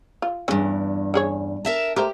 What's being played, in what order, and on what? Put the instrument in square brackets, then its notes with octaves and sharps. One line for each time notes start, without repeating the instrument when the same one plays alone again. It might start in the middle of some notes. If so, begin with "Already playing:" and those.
[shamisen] F4
[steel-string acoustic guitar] E2 G2 [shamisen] C#4 D4 G#4
[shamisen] C#4 G#4 C#5
[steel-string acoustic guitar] A#4 E5 A5
[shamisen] A3 A#4 C5 [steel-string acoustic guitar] G4